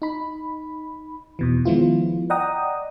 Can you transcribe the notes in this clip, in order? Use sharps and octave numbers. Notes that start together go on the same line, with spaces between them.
D#4 B5
E2 B2 E3
D#3 F3 G#3 B3 E4 F4
D5 D#5 F#5 G5 A#5 D#6